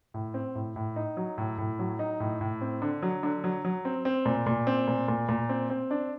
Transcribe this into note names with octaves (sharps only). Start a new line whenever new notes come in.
A2
C4
A2
A2
D#4
F#3
A2
A2
F#3
D#4
A2
A2
C4
D3
F#3
D3
F#3
F#3
C4
C4
A#2
A#2
C4
A#2
A#2
A#2
C4
C4
D4